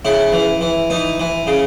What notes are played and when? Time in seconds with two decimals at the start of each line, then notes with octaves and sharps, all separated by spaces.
0.05 C#3 E4
0.33 E3
0.61 E3
0.90 E3 D#4
1.20 E3
1.47 C#3